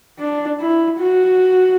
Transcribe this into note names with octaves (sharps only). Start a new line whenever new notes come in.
D4
E4
F#4